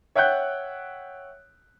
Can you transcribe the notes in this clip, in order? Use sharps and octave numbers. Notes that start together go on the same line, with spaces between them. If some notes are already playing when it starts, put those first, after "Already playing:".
C#5 E5 F#5 G5 F#6 G6